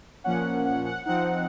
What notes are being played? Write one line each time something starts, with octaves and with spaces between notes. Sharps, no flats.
A#2 F3 A#3 C#4 F#5
F#5
F#5
F3 C4 D#4 F#5